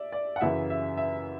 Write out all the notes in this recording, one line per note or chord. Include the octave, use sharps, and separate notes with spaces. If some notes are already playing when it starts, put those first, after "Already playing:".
Already playing: D5 E5
D5
F#5
F#2 C#3 E3 E5
E5
E5